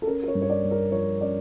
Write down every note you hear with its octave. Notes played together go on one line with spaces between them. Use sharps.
A4
C#4 A#4
A#4
C#5
G2
C#5
D5
G2
A#4
F3 C#5
C#4 D5